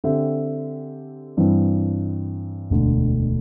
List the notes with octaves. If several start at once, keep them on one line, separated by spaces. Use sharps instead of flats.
D3 C4 G4 E5
G2 E3 C4
E1 D2 D3